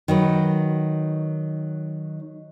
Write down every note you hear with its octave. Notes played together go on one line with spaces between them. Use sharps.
D#3 F#3 B4